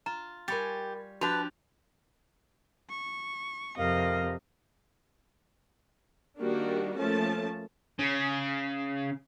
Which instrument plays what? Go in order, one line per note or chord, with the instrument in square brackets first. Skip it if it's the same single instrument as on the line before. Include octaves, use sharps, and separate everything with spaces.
[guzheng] F4 [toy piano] A#5
[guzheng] G3 C#5 G#5 [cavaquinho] G4 [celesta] A#4 B5 A6
[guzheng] F3 D4 G4 [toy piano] F#4 [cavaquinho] B4 A5 [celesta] F#6 F7
[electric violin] C#6
[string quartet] F2 C3 [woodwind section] A#4 F5 [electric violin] D#5
[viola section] D#3 G3 A#3 D4 F#4 G4
F3 A3 A#3 C#4 A5
[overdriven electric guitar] C#3